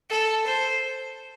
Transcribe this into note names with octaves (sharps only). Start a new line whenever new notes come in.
A4
C5